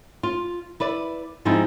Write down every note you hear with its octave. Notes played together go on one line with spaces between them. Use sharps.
F4
E4 B4 D5
G#2 F3 C4 D#4 E4